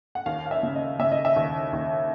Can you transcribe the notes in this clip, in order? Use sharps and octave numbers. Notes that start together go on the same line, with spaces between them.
F#5
D#2 F5
F5
E5
C#3
D#5
C#3 E5
D#5
E5
D#2
D#2